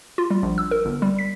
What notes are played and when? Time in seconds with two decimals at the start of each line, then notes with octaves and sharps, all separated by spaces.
0.18 F4
0.30 G3
0.43 A#1
0.58 E6
0.71 A#4
0.85 G1
1.02 G3
1.19 B6